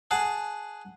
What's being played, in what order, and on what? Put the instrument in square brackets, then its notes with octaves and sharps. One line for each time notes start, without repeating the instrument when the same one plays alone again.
[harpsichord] G#4 F#5 A5